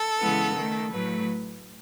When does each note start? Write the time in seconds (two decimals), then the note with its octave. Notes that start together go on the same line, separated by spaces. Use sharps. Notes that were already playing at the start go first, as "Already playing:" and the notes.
Already playing: A4
0.19 C#3 E3 G#3 B3
0.55 D#3 A3
0.92 A2 F#3 A3 B4